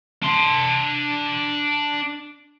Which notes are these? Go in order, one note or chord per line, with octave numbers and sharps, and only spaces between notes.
D4 C6